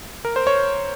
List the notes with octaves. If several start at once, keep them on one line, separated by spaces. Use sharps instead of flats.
A#4
C5
C#5